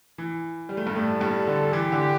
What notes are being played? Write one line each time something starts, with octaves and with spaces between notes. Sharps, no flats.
E3
G3
A3
G2 G3
A2 A3 A4
G2 G3
D3
E3 G4
D3